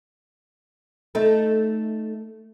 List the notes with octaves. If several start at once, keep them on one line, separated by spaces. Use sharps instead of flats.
A3 D#4 A4